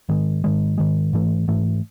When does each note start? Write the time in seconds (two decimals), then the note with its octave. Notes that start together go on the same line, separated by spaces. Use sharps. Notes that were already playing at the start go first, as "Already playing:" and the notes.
0.09 G#2 D#3 G#3
0.44 G#2 D#3 G#3
0.78 G#2 D#3 G#3
1.13 G#2 E3 A3
1.48 G#2 E3 A3